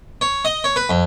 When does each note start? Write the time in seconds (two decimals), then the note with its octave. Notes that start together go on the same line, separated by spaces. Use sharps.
0.21 C#5
0.45 D#5
0.64 C#5
0.76 B4
0.90 F2